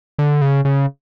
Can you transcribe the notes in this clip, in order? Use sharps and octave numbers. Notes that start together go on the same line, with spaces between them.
D3
C#3
C#3